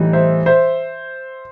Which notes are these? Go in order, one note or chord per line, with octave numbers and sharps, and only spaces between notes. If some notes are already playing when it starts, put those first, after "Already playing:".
Already playing: A2 E3 G3 D#4
C5 E5
C5 E5